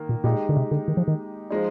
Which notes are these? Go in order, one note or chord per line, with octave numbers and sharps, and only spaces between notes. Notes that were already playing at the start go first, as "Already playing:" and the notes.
Already playing: D#3 A#3
A#2
A#2 G#3 D#4 G4
D3
C3
D3
D#3
F3
D#3
F3 G#3 D#4